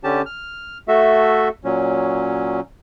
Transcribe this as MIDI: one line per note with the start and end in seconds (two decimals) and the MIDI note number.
0.04 0.22 50
0.04 0.22 61
0.04 0.22 67
0.04 0.22 81
0.26 0.78 89
0.88 1.49 57
0.88 1.49 66
0.88 1.49 69
0.88 1.49 76
1.64 2.60 46
1.64 2.60 54
1.64 2.60 61